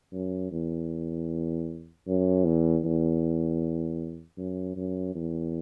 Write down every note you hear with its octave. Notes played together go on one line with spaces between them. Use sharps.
F#2
E2
F#2
E2
E2
F#2
F#2
E2